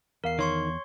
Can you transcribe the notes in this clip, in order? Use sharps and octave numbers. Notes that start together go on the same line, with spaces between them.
E2 A#4 F5 C7
D#3 C#5 C6 C#6